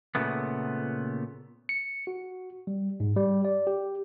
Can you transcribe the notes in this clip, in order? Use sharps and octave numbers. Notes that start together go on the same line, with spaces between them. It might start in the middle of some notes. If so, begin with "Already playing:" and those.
A#2 C#3 A3 B3
C#7
F#4
G3
G#2
G3
D5
G4